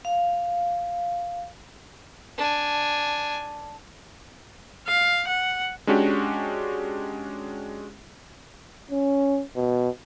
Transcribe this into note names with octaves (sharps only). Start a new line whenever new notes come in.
F5
D4 G#5
F5
F#5
G#3 C#4 D4 F#4 G4
C#4
B2